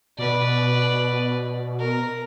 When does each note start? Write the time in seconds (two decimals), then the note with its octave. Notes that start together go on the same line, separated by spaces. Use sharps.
0.18 B2 B4 D5
1.79 A#4